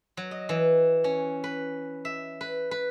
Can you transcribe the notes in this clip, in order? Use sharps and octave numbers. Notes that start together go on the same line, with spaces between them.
F#3
D#5
E3
C#4
B4
E5
B4
B4